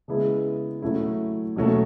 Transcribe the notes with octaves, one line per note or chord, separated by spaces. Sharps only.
C#3 G#3 B3 E4
F#3 A3 E4
B2 F#3 A3